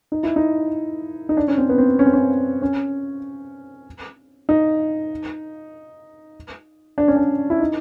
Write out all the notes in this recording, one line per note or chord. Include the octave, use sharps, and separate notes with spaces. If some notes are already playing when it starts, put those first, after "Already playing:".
D#4
E4
D#4
D#4
D4
C#4
C4
B3
C4
C#4
C4
C#4
C#4
D#4
D4
C#4
D4
E4
D#4